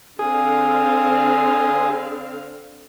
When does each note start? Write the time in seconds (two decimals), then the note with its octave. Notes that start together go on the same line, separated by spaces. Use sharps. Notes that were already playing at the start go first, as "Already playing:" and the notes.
0.19 D3 C4 G#4 F5